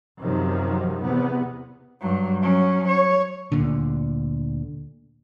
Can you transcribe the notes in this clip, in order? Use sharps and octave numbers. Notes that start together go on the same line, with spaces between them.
F#2 C3 D#3 F3 F#3
E2 C3 B3
G2 F#3
F#3 C#4
C#5
D2 A#2 D3